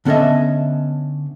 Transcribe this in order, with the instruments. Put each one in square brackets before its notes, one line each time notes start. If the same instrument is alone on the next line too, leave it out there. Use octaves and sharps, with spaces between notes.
[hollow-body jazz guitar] D3 B3 C#4 A4 D#5 E5